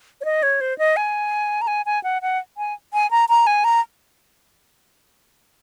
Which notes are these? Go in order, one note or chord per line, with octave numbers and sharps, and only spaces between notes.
C#5
D#5
C#5
C5
D#5
G#5
A#5
G#5
G#5
F#5
F#5
G#5
G#5
A#5
A#5
G#5
A#5